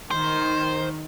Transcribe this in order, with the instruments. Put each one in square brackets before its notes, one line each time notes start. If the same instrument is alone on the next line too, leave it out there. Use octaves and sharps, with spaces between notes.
[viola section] D#3 [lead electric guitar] C5